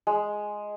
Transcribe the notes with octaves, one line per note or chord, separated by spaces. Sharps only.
G#3